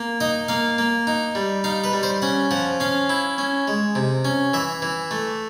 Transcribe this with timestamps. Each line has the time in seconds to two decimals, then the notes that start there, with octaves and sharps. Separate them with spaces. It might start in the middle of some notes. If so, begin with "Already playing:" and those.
Already playing: A#3
0.20 D#4 D#5
0.48 A#3 F5
0.78 A#3
1.07 D#4
1.35 G3
1.64 D#4 F5
1.84 B4
1.93 G3
2.03 C5
2.22 C#4 F#5
2.51 F3 F#5
2.80 C#4 F5
3.10 E4
3.38 C#4
3.68 G#3
3.95 C3
4.25 C#4
4.53 E3 E5
4.82 E3
5.11 A3